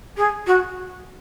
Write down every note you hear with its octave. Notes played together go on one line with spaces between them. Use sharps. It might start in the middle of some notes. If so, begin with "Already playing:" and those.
G#4
F#4